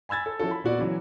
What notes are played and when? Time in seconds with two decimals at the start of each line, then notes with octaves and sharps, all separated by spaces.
0.09 G#5 B5 E6 G#6 A6
0.26 A4
0.39 F3 C#4 E4 F#4 A4
0.51 B5
0.64 A#2 B3 F#4 D5
0.79 C#3 E3 F#3